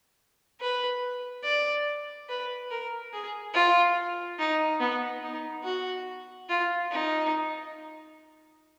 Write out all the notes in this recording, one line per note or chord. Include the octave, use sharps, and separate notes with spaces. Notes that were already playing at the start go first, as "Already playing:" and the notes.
B4
D5
B4
A#4
G#4
F4
D#4
B3
D#4
F#4
F4
D#4